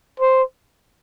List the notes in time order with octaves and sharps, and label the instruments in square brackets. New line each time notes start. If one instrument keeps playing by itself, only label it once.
[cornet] C5